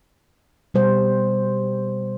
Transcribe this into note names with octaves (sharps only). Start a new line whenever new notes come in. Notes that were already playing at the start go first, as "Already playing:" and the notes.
B2 G3 C5